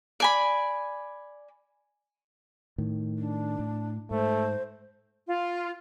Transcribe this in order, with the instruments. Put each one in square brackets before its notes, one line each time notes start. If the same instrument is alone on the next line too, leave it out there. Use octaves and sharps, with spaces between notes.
[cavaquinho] D5 G#5 B5
[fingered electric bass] A2 D#3
[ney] D4
[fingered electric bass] A2
[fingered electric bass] G#2 [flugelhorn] A3 [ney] C5
[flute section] F4